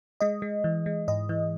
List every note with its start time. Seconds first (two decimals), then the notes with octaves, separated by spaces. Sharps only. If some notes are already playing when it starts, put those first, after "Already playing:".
0.21 G#3 D#5
0.42 G#3
0.64 E3
0.86 G#3
1.08 G#2 D#5
1.29 E3